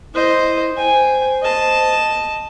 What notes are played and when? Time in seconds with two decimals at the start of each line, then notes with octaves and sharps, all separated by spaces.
0.14 E4 C5 D#5
0.76 C5 G5 G#5
1.43 D#5 A5